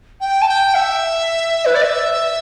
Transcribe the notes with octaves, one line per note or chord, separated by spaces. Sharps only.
G5
A5
G5
E5
B4
D5
E5